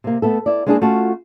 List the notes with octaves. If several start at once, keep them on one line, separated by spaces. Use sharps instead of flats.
C3 A#3
A3 B3 A4
E4 D5
G#3 A#3 D4 E4 F#4 G#4
A3 C#4 F4 F#4 F#5 A5